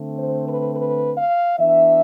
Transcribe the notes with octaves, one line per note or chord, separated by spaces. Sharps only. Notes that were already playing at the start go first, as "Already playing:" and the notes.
Already playing: D3 A3 C4
C5
B4
B4
F5
E3 B3 D4 E5